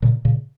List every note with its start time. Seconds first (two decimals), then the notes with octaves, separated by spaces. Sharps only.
0.02 A#2 C#3
0.25 A#2 C#3